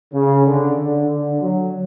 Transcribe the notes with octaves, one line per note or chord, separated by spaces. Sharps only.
C#3
D3
D3
D3
F#3